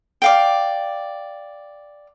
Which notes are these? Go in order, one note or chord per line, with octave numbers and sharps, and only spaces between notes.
D5 F5 G5